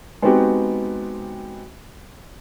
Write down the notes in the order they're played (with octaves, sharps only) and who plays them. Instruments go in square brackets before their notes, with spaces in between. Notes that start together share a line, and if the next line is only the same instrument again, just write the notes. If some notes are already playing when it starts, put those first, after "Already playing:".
[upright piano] G#3 B3 C4 D#4 F#4 G4